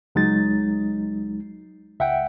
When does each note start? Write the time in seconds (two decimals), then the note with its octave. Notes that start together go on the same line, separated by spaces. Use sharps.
0.15 C#2 F#3 G#3 D#4 A6
1.99 C#2 E5 F#5 G5